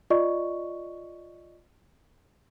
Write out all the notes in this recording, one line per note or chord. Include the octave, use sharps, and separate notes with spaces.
F4 D5 D#5 C#6